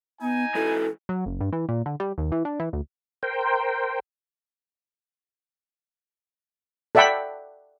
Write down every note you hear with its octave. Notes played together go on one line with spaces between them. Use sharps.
B3 D#4 G#5
G#2 E3 A4
F#3
F#1
G2
E3
A#2
D3
G3
D#2
E3
D4
E3
D2
A#4 C5 G5
A4 D5 E5 F#5 G5 B5